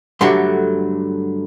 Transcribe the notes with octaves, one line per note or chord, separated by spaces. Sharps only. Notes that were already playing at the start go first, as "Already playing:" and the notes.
G2 D3 F#3 A3 C6